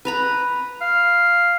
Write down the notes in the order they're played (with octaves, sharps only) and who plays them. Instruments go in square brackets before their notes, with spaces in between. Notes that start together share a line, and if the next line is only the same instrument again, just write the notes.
[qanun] B4 A#5 B5
[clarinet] F5